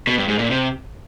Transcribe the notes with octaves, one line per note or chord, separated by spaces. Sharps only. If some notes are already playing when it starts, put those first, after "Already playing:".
B2
G2
G#2
A#2
C3